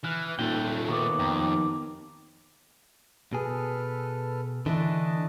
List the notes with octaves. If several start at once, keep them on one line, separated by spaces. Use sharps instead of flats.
E3 F6 F#6
D#1 A#2 A3 G5
D#2 D#3 B3 C#6 D6
F2 G5 A#5
D6
B2 G#4 A4 B4 F6
D3 E3 A3 D4 D#5 A5